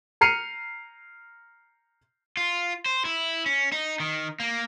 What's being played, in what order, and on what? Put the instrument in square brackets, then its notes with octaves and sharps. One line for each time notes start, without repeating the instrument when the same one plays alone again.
[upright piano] A#5 F6 C7 C#7 D#7 F7
[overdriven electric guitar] F4
C5
E4
C#4
D#4
D#3
A#3